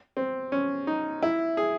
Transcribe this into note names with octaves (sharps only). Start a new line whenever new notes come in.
C4
C#4
D#4
E4
G#4